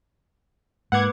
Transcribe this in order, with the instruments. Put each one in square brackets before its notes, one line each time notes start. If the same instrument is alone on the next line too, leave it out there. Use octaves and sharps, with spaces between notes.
[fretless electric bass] G#2 [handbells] A#3 B4 D6 [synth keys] F#5 G#6